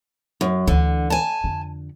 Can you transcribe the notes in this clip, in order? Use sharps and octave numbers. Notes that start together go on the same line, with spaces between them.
F#2
D2 D3 E3
G#5 A5
F2 D3